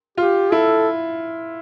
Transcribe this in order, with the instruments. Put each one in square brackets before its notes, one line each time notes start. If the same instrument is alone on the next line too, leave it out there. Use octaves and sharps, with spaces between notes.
[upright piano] F4 [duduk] G4
[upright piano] E4 [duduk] A4